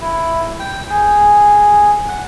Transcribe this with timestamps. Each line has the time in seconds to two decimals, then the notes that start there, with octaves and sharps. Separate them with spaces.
0.02 E4
0.60 G5
0.90 G#4
2.08 F#5